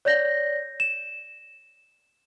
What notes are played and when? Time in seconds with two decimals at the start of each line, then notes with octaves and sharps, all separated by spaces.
0.05 C#5 D5 G6 A#6
0.80 E7